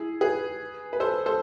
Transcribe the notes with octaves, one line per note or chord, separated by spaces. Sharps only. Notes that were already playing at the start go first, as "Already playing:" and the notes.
Already playing: E4 G#4
G#4 B4
B4
A4 C5
A4 C5